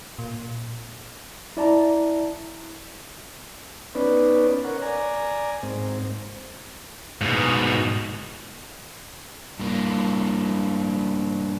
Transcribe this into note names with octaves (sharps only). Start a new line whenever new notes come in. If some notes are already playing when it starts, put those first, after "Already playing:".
A#2
E4 D5 A5 A#5
B3 C#4 D#4 B4 D5
A#4 C#5 F#5
D5 G#5 A#5
G#2 C4
G#2 B2
G2 A#3